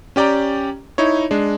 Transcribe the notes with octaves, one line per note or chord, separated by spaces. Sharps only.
C#4 G4 D5 G5 A#5
D#4 E4 C#5
G#3 D4